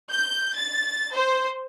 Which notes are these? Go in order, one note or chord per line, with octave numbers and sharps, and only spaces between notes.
G6
A6
C5